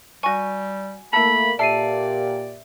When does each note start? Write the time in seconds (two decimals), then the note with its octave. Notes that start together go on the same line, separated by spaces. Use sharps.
0.23 G3 F#4 G#5 C#6
1.13 A3 A#3 E4 A4 B5
1.59 A#2 G4 A4 D5 E5 C7 D#7